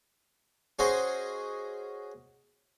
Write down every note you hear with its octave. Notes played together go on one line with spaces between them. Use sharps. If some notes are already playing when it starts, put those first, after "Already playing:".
C#4 F#4 G#4 C5 D#5